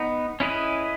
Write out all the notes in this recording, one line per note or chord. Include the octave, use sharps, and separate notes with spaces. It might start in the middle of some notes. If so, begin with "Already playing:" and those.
Already playing: B3 D#4
C#4 E4 G#4 B4 D#5